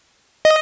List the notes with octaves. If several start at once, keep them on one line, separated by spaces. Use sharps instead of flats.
D#5